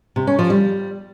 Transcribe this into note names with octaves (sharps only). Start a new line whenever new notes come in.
C3
C#4
F3
G3